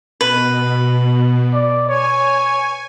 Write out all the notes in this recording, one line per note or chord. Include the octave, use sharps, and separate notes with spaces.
B2 B4
D5
C#5 G#5